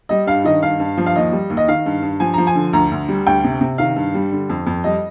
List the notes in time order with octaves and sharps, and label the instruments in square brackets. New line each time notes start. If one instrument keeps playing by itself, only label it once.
[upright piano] G3 D#5
G2 F5
D#3 D#5
G2 F5
G2
F3
F5
D#2 D#5
G3
D#2
D#5
D#3 F5
G2
G2
F3 G#5
F3 A#5
G#5
D3
D2 A#5
D2
G3
D2 G5
C3
C3
D#3 F5
G2
G3
D3
F2
F2
G3 D#5